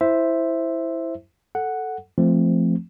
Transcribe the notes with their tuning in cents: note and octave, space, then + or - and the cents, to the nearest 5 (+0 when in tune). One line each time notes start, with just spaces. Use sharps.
E4 +0 C5 +0 E5 +0
A4 +0 F#5 +0
F3 -15 A3 +0 C4 +0